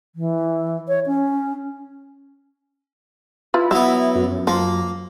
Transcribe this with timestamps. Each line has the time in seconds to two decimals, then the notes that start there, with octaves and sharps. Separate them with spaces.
0.15 E3
0.88 C#5
1.07 C#4
3.54 E4 F4 B4
3.71 F#3 B3 E4 E5
4.15 F#2
4.47 F3 A#3